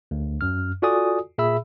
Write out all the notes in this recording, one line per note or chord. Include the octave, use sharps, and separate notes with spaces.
D2
F#2 F6
F4 F#4 A4 D5 G#5 D#6
A#2 G#4 E5 B5 E6